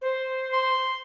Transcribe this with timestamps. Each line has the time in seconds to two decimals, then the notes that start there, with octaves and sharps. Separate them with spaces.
0.02 C5
0.53 C6